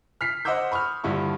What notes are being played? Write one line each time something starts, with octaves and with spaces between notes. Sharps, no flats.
F6 B6 C7
C5 D#5 F#5 D6 E6 G6
B5 C#6 D#6 F6
D#1 G2 D3 E4 C#6